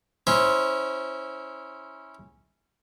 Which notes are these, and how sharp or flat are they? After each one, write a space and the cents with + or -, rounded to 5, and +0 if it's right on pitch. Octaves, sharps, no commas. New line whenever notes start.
C#4 -10 E4 -25 C5 +0